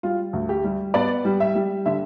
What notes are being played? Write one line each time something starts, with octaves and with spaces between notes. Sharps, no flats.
G3 F4
D2
G4
G3
B3 D5
G3
E5
G3
D3 E5